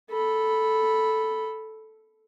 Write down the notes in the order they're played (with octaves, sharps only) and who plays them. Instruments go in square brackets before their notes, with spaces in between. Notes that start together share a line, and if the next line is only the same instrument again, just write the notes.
[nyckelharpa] A4 B5